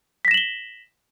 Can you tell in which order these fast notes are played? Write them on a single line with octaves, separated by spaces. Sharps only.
B6 A#6 E7 F#7 G7